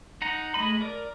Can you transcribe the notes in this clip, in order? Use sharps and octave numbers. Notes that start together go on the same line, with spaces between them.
D#4 F#5 A#5
G#3 A3 D#5 B5
A#4 D5